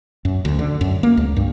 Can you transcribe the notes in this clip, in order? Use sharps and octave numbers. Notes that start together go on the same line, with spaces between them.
F#2
D2
D3
F#2
A#3
C#2
G2